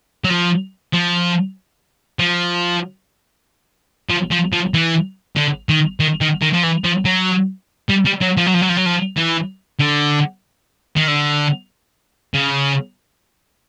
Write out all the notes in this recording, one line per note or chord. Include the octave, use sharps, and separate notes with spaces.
F#3
F3
F3
F3
F3
F3
F3
E3
D3
D#3
D#3
D#3
D#3
F3
E3
F3
F#3
G3
G3
F#3
F3
F#3
F3
F#3
F3
F#3
F3
E3
D3
D#3
D3
C#3